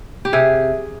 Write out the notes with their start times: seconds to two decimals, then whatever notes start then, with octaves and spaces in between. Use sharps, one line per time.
0.25 G4
0.33 C3 G#4